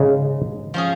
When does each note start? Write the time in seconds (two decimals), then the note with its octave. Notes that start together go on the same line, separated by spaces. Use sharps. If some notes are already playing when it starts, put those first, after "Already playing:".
Already playing: G#2 C#3 G#3
0.74 F3 C#4 G#4